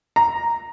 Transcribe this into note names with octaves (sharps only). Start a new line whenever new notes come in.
A#5